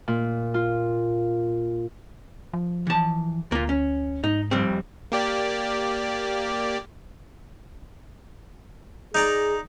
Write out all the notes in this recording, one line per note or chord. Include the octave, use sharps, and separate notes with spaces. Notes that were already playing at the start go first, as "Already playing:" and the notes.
A#2
F4
F3
E3 A5
D2 A#3 F4
C#4
G#2 D#4
F2 G3 C4
A#3 G4 D5
D#4 G#4 D5 A#5